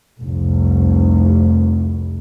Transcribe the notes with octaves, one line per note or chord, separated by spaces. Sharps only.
F1 C2